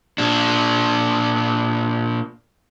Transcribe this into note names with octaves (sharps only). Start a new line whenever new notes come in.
A#2 D4